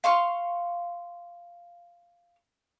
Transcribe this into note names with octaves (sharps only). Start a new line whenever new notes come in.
F5 C6 C#6 F6